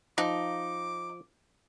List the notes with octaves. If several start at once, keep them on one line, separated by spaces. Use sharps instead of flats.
F3 D#4 D6